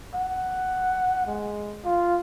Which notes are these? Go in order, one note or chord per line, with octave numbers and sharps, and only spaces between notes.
F#5
G#3
F4